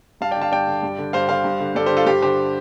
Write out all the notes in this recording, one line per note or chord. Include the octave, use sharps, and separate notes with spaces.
G2 F5 A5
D5 G5
D3
F5 A5
G2 D5 G5
D3
G2
D3
G2 C5 F5
D3 C5 F5
G2
D3
G2 A4 D5
G4 C5
D3
F4 A4
G2 G4 C5
D3 G4 C5